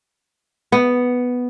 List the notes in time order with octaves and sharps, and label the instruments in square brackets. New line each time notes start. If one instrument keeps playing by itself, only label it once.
[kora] B3